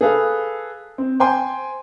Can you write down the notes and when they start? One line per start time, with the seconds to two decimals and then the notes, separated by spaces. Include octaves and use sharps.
0.01 G#4 A4 B4 F5
0.98 C4
1.20 C5 G5 G#5 C6